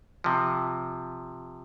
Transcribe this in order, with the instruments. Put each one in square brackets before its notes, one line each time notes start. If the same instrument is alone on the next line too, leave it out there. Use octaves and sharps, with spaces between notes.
[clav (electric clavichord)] C3 F3